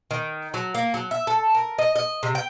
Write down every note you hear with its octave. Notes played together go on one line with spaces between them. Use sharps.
D#3
F#3
A#3
F#3
E5
A4
A#4
D#5
D#5
C3
G5